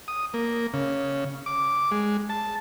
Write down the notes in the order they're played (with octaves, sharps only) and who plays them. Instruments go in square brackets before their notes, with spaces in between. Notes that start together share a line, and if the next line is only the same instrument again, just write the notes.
[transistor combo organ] D#6
A#3
C#3
D6
G#3
A5